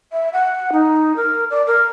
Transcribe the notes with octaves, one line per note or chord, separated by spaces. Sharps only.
E5
F#5
D#4
A#4
D5
A#4